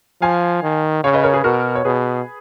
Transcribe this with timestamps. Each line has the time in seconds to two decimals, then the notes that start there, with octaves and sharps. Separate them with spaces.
0.21 F3 F5 G#5
0.63 D#3
1.04 C#3 C#5 F5
1.14 B4 D#5
1.23 A#4 C#5
1.33 G#4 B4
1.44 B2 F#4 A#4
1.75 C#5
1.84 B2 G#4 B4